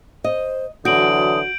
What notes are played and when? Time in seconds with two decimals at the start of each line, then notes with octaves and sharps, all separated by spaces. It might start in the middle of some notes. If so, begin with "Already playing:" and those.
0.24 C5 D#5
0.85 D3 E3 F#3 F#4 D#6 G6 D7 F#7